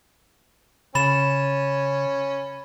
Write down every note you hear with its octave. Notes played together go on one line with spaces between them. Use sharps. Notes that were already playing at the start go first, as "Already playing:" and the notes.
C#3 C#4 B5 A6 E7